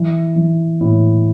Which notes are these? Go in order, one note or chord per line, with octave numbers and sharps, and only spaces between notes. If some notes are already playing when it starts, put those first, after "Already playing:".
Already playing: E3
E3
A2